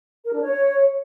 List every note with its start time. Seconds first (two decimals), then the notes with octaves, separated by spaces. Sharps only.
0.24 A#4
0.33 D4
0.43 C#5